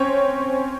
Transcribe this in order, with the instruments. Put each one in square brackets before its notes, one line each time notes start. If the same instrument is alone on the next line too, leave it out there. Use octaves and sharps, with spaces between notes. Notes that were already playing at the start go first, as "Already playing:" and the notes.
Already playing: [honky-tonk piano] C4 C#4 C5 C#5